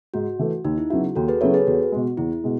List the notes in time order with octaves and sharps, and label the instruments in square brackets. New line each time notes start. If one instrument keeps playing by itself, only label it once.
[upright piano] G#2 [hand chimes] F#4
[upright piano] E3 A3
[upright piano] D#2 [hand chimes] D#4
[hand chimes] E4
[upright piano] C#3 F#3 B3 E4 [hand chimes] F#4
[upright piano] D#2 [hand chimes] F#4 A4
[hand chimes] G#4 B4
[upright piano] C#3 F#3 B3 E4 [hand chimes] A4 C#5
[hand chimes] G#4 B4
[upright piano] E2 [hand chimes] F#4
[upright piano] B2 G#3
[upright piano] E2 [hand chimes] E4
[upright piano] B2 G#3